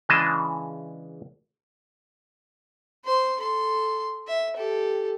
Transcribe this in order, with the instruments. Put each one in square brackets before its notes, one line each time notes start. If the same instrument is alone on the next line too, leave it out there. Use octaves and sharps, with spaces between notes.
[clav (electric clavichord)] C#3 E3 G#3 D4 D#5 A5
[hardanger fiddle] C5 C6
A4 C6
E5
G4 A4